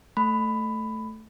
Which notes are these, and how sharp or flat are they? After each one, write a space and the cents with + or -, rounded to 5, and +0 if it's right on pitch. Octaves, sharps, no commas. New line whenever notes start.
A3 +0 B5 +15